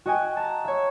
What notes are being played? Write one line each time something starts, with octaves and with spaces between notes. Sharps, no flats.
F#4 D#5 G5 G#5
A5 A#5
C#5 E5